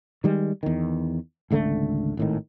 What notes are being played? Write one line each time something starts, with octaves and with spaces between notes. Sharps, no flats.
D#3 G3 G#3
E2 D#3
G#1 C#2 D3 A3
G#1 A2 D#3